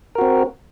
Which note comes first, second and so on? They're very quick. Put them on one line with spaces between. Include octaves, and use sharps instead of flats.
A#4 F#4 C4